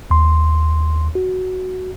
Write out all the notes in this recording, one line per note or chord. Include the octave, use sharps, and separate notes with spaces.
D#2 C6
F#4